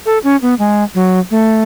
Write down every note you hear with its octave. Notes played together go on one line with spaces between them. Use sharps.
A4
C#4
B3
G#3
F#3
A3